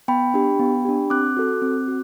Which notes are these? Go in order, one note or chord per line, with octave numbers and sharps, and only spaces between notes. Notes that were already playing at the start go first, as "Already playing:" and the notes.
B3 G5 B5
D4 G4
B3
D4 G4
C4 D6 F#6
F#4 A4
C4
F#4